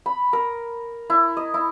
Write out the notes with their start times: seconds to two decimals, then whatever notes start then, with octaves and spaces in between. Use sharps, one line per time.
0.06 B5
0.33 A#4
1.10 E4
1.37 D#5
1.54 E4